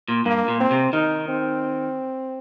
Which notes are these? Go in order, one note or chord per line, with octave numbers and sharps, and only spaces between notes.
A#2
G2 A#3
A#2
C4
C3
D#3 D#4
C4